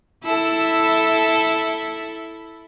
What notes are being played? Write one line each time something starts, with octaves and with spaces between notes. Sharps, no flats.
E4 A4